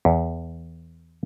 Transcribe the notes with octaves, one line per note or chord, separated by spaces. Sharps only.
E2